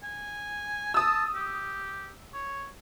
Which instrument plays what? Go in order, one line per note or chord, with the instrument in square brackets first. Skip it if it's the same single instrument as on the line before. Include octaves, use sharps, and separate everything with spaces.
[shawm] G#5
[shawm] A5 [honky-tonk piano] D#6 E6
[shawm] G4
C#5